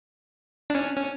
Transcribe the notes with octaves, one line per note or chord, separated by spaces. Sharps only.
D4
C#4
C#4